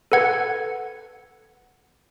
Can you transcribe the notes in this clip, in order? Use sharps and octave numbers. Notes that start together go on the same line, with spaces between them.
A4 B4 F#5 G#6